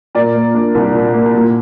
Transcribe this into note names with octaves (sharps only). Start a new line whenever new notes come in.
A#2 A#4 D5
A#3
D4
C2
A#2
A#3
A#2